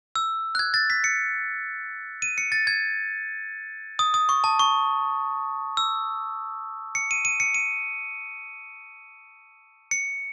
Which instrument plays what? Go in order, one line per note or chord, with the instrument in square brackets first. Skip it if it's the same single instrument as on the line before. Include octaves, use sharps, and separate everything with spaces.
[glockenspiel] E6
F#6
G#6
A6
B6
C#7
D#7
C#7
A6
G#6
D#6
D#6
C#6
A5
C#6
E6
C#7
D#7
D#7
C#7
D#7
C#7